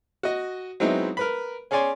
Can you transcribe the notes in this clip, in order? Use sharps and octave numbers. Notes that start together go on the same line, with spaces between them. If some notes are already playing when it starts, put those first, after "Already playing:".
F#4 D#5
F#3 G#3 B3 C4 D#4 E4
A#4 B4 B5
C#4 G#4 C#5 D5 G#5 C6